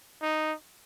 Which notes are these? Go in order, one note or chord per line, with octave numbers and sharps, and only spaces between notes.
D#4